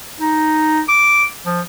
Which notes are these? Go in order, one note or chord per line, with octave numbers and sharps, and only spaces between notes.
D#4
D6
F3